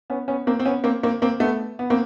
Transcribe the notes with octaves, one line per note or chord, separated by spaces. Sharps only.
B3 C#4
B3 C#4
A#3 C4
C4
B3 C#4
A#3 C4
A#3 C4
A#3 C4
A3 B3
B3
A#3 C4